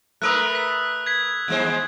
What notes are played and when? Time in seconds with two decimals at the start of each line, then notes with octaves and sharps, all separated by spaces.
0.22 A3 A#4 B4 D#6 E6 F#6
0.55 B6
1.06 G#6 B6
1.48 D#2 G#3 C5